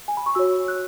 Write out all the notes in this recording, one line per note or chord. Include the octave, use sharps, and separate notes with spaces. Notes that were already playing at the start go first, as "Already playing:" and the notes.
G#5
B5
C#6
F#4 C#5 E6
F#6